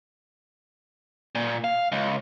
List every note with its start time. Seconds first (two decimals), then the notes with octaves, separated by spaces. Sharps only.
1.35 A#2
1.64 F5
1.92 C#2